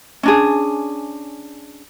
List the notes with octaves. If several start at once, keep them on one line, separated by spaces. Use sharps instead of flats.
C#4 D4 G#4